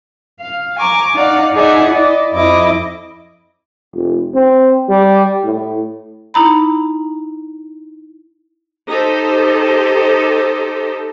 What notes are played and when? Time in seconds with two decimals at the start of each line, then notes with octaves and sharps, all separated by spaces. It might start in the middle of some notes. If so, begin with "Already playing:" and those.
0.40 F5
0.78 G#5 A#5 C#6 D6
1.15 D#4 D5 F5 F#5
1.53 D#4 G#4 D5 E5 F#5
1.88 E4 D5 D#5
2.33 F2 E4 D#5 D6
3.93 F1
4.34 C4
4.88 G3
5.44 A2
6.34 D#4 E4 A#5 B5
8.89 D#4 G4 A4 C5